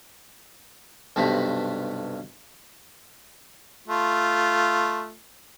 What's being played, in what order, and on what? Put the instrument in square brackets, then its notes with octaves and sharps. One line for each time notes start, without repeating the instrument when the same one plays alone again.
[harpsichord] B1 G2 C3 A3 C5 B5
[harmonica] A3 F4